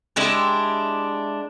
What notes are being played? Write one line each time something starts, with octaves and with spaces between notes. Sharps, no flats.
G#3 D4 E4 G4